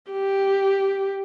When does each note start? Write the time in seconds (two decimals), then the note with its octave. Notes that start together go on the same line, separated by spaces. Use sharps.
0.11 G4